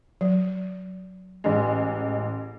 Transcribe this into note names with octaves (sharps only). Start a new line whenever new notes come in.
F#3
A1 G#3